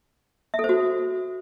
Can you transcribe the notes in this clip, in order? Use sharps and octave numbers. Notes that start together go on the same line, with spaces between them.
E5
A4
C5
F#4